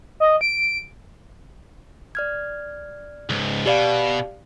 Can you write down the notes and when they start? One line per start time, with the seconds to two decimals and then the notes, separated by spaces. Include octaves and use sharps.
0.20 D#5
0.41 D7
2.15 D5 F6 G#6
3.30 C#2 G#2
3.66 B2 G4 D5 F5